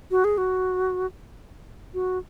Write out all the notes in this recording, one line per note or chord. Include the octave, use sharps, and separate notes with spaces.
F#4
G#4
F#4
F#4